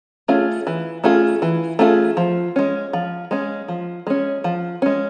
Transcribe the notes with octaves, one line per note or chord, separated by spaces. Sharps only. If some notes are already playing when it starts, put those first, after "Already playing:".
A3 C#4 F4 G#4
E3
A3 C#4 F4 G#4
E3
A3 C#4 F4 G#4
F3
G#3 C#4
F3
G#3 C#4
F3
G#3 C#4
F3
G#3 C#4